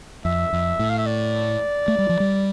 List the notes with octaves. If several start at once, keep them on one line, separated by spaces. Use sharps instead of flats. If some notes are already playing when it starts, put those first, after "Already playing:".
F2 E5
F2
A2
F5
E5
D5
A3
G3
F3
G3